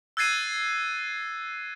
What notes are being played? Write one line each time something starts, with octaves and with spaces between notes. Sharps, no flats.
E6 F#6 G#6 A6 C7 D#7